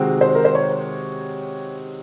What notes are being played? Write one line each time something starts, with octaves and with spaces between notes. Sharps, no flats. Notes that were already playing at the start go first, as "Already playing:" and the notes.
Already playing: C3 D#3 G#3 C4 F#4
C5
A#4
C5
C#5